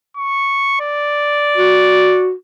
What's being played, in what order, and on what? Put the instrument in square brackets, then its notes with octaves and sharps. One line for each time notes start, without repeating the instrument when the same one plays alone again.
[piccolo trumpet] C#6
D5
[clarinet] F#4